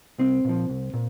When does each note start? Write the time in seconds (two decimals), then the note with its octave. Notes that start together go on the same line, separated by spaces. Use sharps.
0.18 C2 C4
0.45 A#2 F3
0.69 C2
0.93 A#2